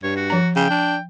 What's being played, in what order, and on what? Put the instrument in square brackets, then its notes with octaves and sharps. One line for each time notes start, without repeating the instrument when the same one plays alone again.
[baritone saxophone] G2 [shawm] C#5
[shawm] F#4
[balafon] F3 A#5
[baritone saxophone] C#3 [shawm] G5
[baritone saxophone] D4